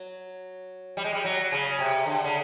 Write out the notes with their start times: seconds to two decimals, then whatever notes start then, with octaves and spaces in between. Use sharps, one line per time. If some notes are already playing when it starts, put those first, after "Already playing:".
Already playing: F#3
0.97 G3
1.04 G#3
1.13 G3
1.25 F#3
1.52 C#3
1.79 C3
2.06 D3
2.24 C#3